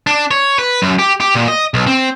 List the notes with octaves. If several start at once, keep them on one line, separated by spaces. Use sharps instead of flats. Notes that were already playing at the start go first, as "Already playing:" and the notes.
D4
C#5
B4
F#2
G4
G4
A#2
D#5
B1
C4